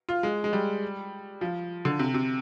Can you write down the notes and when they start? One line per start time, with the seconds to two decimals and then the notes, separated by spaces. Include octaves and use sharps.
0.09 F4
0.23 G#3
0.44 G#3
0.53 G3
1.41 F3
1.85 D3
1.99 C3
2.14 C3